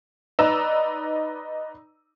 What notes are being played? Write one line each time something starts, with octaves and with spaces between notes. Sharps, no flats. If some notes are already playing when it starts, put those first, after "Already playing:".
D#4 B4 D5 A#5 E6 E7